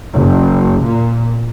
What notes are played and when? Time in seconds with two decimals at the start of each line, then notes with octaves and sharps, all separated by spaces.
0.14 F#1
0.84 A#2